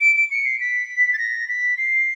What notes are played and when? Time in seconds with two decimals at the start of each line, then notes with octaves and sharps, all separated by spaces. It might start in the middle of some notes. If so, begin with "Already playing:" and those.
0.01 D7
0.16 D7
0.31 C#7
0.45 C7
0.60 B6
1.13 A6
1.19 A#6
1.48 B6
1.78 C7